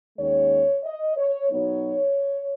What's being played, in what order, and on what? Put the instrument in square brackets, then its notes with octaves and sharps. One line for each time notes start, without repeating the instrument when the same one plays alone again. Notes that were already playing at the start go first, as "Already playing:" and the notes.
[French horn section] D#2 D#3 G#3 C#4 C#5
D#5
C#5
B2 F#3 B3 D#4 C#5